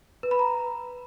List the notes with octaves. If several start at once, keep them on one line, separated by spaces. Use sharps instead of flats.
B4
B5
A#5